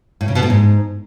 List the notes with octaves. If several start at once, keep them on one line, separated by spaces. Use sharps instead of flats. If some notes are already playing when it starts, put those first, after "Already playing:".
A2
C#3
B2
A2
G#2